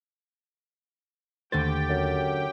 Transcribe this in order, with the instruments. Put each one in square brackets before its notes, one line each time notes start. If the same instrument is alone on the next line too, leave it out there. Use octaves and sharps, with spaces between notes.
[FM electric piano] D#2 A6 [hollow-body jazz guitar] D3 A3 C5 [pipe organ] G4 G5
[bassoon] F#2